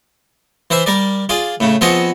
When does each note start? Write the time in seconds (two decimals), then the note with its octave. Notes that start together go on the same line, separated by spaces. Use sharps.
0.70 E3 C5 E5
0.86 G3 A#4 D5
1.29 F4 G#4 D5
1.60 A2 C#3
1.81 F3 B3 C4 G#4 C#5 D#5